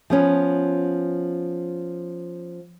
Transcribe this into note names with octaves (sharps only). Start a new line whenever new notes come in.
F3 B3 C#4